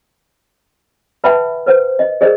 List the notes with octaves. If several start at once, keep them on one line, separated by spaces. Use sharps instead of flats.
B4 E5 F#5 G5 A5 B5
B4 C5 F#5
D#5
G#4 A#4 C5 D5 D#5